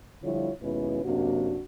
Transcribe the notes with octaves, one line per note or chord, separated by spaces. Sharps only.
D3 F3 G3 E4 F4 C#5
D#2 B2 G#3 C#4 E4 B4
F#2 C3 A#3 D4 F#4